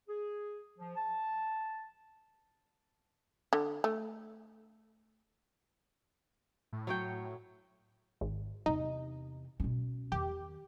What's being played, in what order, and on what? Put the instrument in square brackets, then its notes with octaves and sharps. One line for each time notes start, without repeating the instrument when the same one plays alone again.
[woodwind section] G#4
F3
A5
[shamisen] D3
A3
[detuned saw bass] A2
[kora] F#3 C#5 G5
[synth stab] G#1
[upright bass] E2 C3 [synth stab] D#4
[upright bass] B2 C#4
[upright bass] E2 D#3 [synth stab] G4